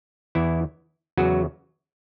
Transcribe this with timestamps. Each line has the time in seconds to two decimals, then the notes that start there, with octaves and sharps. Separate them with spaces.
0.35 E2 E3 E4
1.17 E2 C#3 E3 F#3 F#4